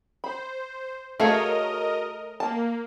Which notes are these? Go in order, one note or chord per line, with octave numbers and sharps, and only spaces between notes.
C5 B5
A3 F#4 G#4 A#4 C#5 D#5 F5
A#3 A5